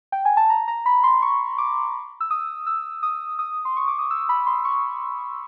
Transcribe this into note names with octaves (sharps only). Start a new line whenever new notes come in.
G5
G#5
A5
A#5
A#5
B5
C6
C#6
D6
E6
D#6
E6
D#6
D#6
C6
C#6
D6
D#6
E6
B5
C6
C#6